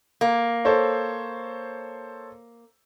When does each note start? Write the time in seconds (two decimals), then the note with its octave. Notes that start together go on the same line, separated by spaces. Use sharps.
0.21 A#3
0.65 A4 C5 C#5